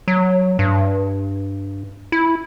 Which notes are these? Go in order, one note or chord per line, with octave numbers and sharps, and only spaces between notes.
F#3
G2
E4